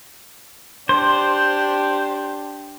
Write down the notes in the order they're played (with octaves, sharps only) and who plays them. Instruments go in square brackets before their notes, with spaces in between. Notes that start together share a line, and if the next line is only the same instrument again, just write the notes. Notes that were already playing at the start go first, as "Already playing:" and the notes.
[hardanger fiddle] D4 G4 [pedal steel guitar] C5